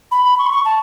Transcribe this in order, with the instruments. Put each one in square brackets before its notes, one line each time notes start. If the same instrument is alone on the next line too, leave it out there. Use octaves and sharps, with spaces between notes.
[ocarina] B5
B5
C#6
B5
C#6
A5